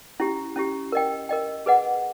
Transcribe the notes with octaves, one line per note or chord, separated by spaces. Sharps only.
C#4 E4 G4
C#4 E4 G4
A#4 D#5 G5
A#4 D#5 G5
G#4 B4 D#5 F#5